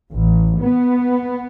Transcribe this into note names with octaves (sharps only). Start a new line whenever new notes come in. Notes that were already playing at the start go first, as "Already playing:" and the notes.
A1
B3